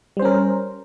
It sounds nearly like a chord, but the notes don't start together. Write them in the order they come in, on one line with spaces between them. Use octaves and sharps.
G3 C5 C#4 A#4